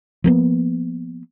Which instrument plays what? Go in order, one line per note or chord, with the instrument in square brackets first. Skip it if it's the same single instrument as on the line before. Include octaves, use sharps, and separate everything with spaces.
[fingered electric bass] F3 A#3 B3